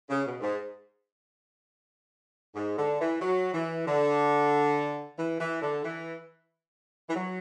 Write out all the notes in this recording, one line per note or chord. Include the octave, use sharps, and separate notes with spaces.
C#3
B2
G#2
G#2
D3
E3
F#3
E3
D3
E3
E3
D3
E3
E3
F#3